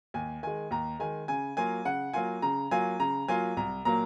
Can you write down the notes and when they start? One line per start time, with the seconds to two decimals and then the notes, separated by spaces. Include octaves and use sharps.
0.14 D#2 G#5
0.43 D#3 G#3 G#5
0.71 D#2 A#5
0.99 D#3 G#3 G#5
1.28 C#3 G#5
1.57 F#3 A#3 F4 G#5
1.85 C#3 F#5
2.13 F#3 A#3 F4 G#5
2.42 C#3 A#5
2.71 F#3 A#3 F4 G#5
3.00 C#3 A#5
3.28 F#3 A#3 F4 G#5
3.57 C2 A#5
3.85 A#2 F#3 A#3 A#5